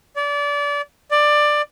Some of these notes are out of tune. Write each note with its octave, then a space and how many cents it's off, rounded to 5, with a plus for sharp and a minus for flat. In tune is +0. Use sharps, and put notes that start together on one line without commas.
D5 -30
D5 +15